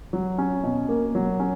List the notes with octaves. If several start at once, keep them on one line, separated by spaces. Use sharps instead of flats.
F#3
C#4
B2
A#3
F#3
C#4